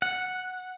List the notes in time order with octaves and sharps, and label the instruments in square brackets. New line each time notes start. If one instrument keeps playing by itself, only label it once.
[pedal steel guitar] F#5